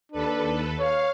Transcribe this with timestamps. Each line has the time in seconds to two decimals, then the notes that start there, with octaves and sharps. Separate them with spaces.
0.12 D#2 D4 A4 B4
0.80 C#5 F5